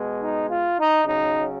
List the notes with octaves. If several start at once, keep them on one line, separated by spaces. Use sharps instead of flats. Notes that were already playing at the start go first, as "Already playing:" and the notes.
Already playing: B2 G#3
D#4
F4
D#4
C#3 F#3 D#4